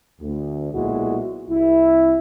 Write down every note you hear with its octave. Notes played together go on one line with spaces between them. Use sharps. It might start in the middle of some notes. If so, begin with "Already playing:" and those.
D2
B1 A#2 G#3 E4 F#4
C2 E4